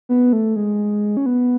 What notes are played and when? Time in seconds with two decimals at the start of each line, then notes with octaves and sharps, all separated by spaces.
0.09 B3
0.33 A3
0.56 G#3
1.17 C#4
1.26 B3